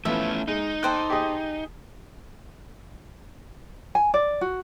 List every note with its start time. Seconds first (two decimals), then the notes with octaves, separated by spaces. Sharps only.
0.05 F3 A3 B3 C#4 E4 E5
0.48 G#3 D#4
0.83 A4 C5 D5 G5 F#6
1.10 G4 G#4 D#5
3.95 G#5
4.14 D5
4.41 F#4